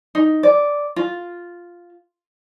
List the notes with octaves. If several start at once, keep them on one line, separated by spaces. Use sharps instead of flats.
D#4
D5
F4